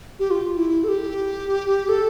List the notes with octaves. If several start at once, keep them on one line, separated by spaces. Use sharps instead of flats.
G4
F4
E4
A4
G4
A4